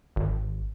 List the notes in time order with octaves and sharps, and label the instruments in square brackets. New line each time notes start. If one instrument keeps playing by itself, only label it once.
[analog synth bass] G#1